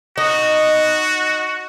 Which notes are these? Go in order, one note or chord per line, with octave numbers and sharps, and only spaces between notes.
D#4 F#4